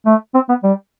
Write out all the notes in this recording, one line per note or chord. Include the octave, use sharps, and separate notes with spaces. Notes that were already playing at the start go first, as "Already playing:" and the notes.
A3
C4
B3
G3